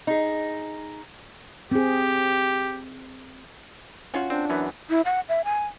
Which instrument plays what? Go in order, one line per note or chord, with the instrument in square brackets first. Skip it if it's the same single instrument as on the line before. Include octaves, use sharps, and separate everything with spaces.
[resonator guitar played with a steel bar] D#4 G#4
[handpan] C4 G#4 [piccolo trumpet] G4
[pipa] C#4 F4 F#4
[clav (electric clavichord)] C4 [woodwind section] D4
[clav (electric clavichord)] F#2 E3 B3
[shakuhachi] E4
F#5
E5
G#5